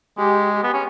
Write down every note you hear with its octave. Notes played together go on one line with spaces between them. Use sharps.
G#3 G4
B3
C#4